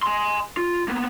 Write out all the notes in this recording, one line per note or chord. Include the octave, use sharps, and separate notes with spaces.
G#5 C6
F4
A#3 B3